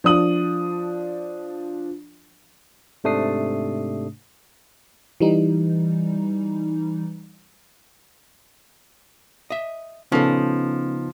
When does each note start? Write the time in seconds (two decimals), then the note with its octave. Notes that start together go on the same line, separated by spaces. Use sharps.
0.04 F3 D4 D#6 F#7
3.04 G#2 C3 A3 D4 D#6 C7
5.20 E3 G3 D#4
9.50 D#5 E5
10.12 C#3 F3 B3 C#4 D#4 A4